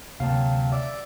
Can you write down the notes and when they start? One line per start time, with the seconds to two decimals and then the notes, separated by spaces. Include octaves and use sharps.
0.20 D2 C3 F#3 A#3 F5 G5 A5
0.72 D5 E5 E6